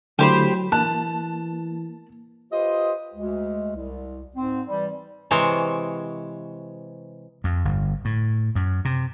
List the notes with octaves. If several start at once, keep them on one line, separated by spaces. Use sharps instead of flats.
D3 F#3 A3 E4 G4 C5 B5
E3 A#3 A5 F#6
F4 G4 B4 C5 D#5
D2 G#3
C2
G#2 C4
E3 G3
C3 E3 G#3 C5 C#5
F2
G1
A2
F#2
C3